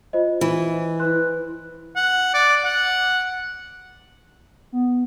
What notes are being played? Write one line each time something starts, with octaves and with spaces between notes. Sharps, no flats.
F4 C5 D#5
E3
B4 C6 F#6
F#5
D5
F#5
B3